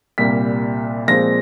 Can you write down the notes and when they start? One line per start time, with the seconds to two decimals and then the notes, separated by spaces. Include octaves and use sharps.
0.18 C2 A#2 G3 B6
1.08 A#2 F3 G#3 C4 A#6